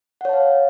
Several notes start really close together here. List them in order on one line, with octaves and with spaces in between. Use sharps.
F#5 C#5 A5 F5